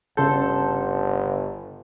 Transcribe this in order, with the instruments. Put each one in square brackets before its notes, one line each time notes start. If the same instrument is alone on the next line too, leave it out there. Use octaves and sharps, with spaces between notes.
[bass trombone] G1 [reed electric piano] C#3 C6 G6 [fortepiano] A4